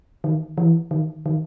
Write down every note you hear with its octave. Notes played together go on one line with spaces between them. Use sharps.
D#3
E3
D#3
D#3